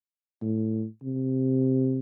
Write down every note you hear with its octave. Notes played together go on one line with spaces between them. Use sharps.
A2
C3